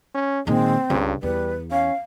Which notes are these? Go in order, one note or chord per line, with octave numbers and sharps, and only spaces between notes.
C#4
A#2 D#3 G#3 C4
C#2 G2
E2 G3 B4
C#4 F5